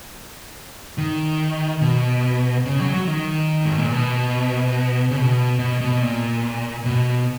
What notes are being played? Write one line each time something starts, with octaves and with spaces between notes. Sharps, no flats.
D#3
B2
C#3
F#3
F#3
D#3
G#2
A#2
B2
C#3
B2
B2
B2
A#2
B2